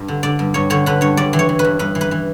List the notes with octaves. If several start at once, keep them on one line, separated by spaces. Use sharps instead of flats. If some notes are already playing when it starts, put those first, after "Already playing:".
Already playing: G2
D3
D3 D5
G2
G2 C#5
D3 C#5
D3 B4
G2 C#5
G2 D5
E3
C#5
E3
B4
G2
G2 B4
E3
B4
E3